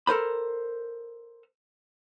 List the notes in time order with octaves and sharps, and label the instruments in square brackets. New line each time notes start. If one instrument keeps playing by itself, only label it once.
[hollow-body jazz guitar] A4 A#4 C5 B5